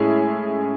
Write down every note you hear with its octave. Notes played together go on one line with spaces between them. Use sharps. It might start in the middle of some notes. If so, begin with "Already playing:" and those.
Already playing: A2 G#3 C#4 E4 G#4